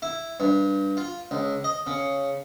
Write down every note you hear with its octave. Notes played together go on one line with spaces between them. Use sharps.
E4
G2
F4
C#2
D#5
C#3